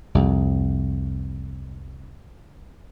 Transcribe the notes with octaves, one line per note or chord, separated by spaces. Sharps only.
C2 F2